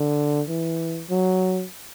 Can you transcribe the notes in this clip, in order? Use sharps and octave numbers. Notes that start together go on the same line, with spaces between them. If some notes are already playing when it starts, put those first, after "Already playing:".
Already playing: D3
E3
F#3